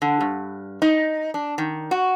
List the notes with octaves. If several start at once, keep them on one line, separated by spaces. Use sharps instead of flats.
D3
G2
D#4
D4
D#3
F#4